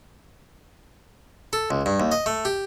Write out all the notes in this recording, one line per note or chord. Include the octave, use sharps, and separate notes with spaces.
A4
C#2
G2
D#2
D#5
A3
G4